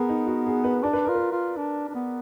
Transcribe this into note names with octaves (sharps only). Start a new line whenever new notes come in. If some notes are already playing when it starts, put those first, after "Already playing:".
Already playing: B3 G#4 A#4 B4
D#4
F#4
G#4
B4
D4 D5
B4
F4 A#4
B4
F4
D4
D4
B3